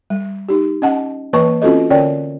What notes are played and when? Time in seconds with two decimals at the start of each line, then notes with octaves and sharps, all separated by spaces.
0.10 G3
0.49 D#4 G4
0.82 C#4 D#5 F#5 A5
1.33 E3 A#3 B4 D#5 A5 C#6
1.62 C4 C#4 F4 F#4 A4 D#5
1.90 D3 C#4 C#5 D5 G5